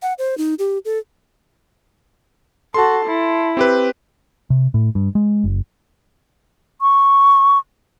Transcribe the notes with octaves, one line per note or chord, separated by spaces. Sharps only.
F#5
C5
D#4
G4
A4
F#4 A4 A5 C6
E4
C4 G4 B4
C3
A2
G2
G#3
F#1
C#6